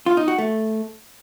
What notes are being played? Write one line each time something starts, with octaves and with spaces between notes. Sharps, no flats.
F4
D#4
F#4
A3